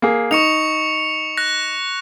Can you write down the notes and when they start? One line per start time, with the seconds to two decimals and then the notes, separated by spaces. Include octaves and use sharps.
0.02 A#3 G#4
0.31 D#4 C#6 C#7 F7
1.37 F#6 A#6